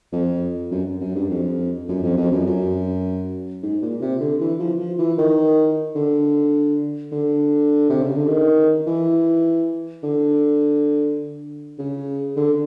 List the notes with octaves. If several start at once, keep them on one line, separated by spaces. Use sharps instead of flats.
F2
F#2
F#2
G2
F2
F#2
F2
F2
F#2
F#2
G#2
A#2
C3
D3
E3
F3
F3
E3
D#3
D3
D3
C3
C#3
D3
D#3
E3
D3
C#3
D3